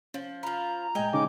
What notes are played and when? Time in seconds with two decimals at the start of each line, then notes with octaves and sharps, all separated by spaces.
0.14 F3 C#4
0.43 F3 F4 A#5 B5 F6
0.95 A2 G#3 D#5 G5 G#5
1.13 C#3 D#4 D6